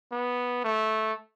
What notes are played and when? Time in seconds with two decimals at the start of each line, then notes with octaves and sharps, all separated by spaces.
0.12 B3
0.64 A3